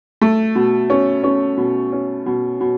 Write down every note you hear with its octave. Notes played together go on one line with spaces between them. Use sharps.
A3
B2
C#4
C#4
B2
C#4
B2
B2